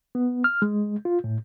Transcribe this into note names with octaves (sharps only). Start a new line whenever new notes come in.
B3
F6
G#3
F4
A2